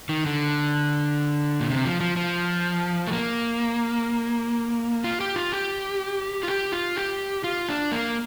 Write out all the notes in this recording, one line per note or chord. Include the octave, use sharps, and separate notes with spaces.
D#3
D3
A#2
C3
F3
F3
F3
A3
A#3
F4
G4
F4
G4
F4
G4
F4
G4
F4
D4
A#3